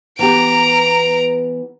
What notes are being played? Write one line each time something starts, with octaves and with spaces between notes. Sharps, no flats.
E3 B3 G4 A#5 D7